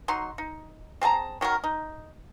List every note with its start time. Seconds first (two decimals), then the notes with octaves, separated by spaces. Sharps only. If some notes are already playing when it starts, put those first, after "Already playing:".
0.08 F#3 D#4 C6
0.38 D#4
1.01 C4 G#4 A5 A#5
1.41 D#3 F#3 G4 A#4
1.64 D#4